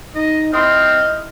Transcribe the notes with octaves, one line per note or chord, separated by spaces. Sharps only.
D#4 D#5
C4 E4 D#5 C6 D#6 F6